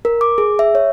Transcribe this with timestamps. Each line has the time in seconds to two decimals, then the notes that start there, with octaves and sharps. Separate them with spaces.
0.05 A#4
0.21 D6
0.38 G#4
0.59 E5
0.75 C#5